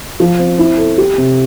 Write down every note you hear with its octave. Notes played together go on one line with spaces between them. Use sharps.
F3
C4
E4
A4
G4
C3